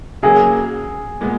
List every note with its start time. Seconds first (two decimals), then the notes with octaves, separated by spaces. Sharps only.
0.23 C#3 F#3 A#3 G#4
1.21 A#2 G#3 B3